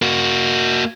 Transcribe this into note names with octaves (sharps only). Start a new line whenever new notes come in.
A#3 F#4